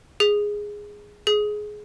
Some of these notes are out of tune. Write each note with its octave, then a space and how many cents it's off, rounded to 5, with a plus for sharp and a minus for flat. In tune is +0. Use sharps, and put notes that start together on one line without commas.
G#4 -5
G#4 +15